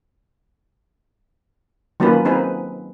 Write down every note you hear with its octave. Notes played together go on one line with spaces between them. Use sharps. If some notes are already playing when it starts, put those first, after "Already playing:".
D#3 F#3 A#3 C#4 F4 B4
C4 D#4 G#4 B4